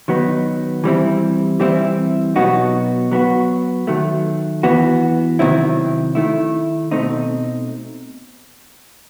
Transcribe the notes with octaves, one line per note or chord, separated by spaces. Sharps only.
D#3 F#3 B3 D#4
E3 G3 C4 E4
E3 G3 C4 E4
B2 F#3 B3 D#4 F#4
F#3 B3 F#4
D#3 F#3 A3
E3 B3 F#4
C3 D#3 F#3 C4 E4
D#3 A3 E4
B2 A3 C4 D#4